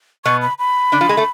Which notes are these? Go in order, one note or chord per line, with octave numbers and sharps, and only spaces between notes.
B2 B3 C#6
B5
B5
D3 D4
F3 F4
G#3 G#4
A3 A4